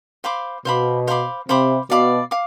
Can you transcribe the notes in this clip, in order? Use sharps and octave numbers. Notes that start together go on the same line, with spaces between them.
C5 F5 B5 D6
B2 C5 F5 B5 D6
C5 F5 B5 D6
C3 C5 F5 B5 D6
B2 D5 F5 B5 D6
F5 D6